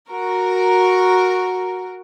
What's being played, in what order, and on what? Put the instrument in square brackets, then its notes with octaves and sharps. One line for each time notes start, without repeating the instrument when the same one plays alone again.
[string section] F#4 A#4